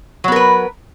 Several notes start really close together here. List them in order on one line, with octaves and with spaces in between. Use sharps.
F#3 B3 A#4 B4